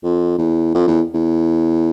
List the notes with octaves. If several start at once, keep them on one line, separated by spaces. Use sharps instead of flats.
F2
E2
F2
E2
E2